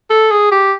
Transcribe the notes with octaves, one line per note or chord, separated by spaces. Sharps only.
A4
G#4
G4